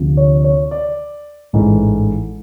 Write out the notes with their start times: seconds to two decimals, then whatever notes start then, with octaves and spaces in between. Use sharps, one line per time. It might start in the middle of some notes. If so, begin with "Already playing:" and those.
Already playing: D2 C3 F3
0.17 C#5
0.44 C#5
0.71 D5
1.53 A1 G#2 E3 A3